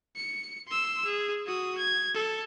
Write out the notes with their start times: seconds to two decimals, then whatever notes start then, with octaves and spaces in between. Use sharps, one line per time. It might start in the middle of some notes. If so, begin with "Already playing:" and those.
0.16 C#7
0.68 C6 E6
1.05 G#4
1.46 F#4 D#6
1.78 G#6
2.15 A4